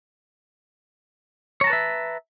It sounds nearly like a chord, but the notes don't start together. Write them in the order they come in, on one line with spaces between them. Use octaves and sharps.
C#5 A#5 A5 B4 E5